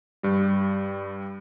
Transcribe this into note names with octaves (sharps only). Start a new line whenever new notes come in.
G2 G3